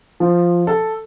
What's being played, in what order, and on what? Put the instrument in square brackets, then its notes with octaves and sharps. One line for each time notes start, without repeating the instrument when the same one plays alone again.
[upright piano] F3
A4